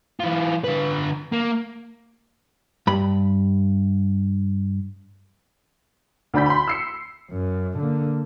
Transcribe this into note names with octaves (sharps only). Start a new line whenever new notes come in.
E3 F4
D3 B4
A#3
G2 B5
D2 D4 B5 G6 B6
B5 C6
E6 C7 C#7
F#2
D3 A#3